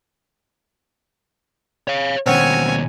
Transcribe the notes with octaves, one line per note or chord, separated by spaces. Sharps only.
C#5 F5
D#2 B2 C4 C#4 C#5 F#5 G#5